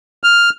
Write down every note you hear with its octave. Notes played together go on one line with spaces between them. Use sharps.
F6